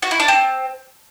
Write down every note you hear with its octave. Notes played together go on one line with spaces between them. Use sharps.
F#4
E4
D4
C4